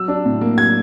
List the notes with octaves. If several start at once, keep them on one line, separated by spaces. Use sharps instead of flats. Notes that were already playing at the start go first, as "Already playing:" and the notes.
Already playing: F#3 E6
D4
A2
A#3
F#3 G#6